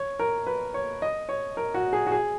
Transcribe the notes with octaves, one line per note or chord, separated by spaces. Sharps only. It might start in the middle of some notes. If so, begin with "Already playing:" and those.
Already playing: C#5
A#4
B4
C#5
D#5
C#5
A#4
F#4
G#4
F#4
G#4